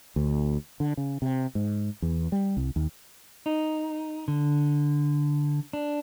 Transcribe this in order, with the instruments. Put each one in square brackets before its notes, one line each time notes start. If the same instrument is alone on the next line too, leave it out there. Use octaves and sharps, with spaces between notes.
[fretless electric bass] D2
D3
C#3
C3
G#2
E2
G3
C2
D#2
[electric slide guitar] D#4
D3
D4